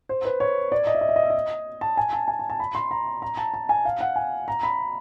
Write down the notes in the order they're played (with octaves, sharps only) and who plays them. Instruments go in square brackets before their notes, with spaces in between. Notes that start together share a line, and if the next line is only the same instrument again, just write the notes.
[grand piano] C5
B4
C#5
D5
D#5
E5
D#5
E5
D#5
E5
D#5
A5
G#5
A5
G#5
A5
A5
B5
C6
A#5
A#5
A5
A5
G#5
F5
F#5
G#5
A#5
B5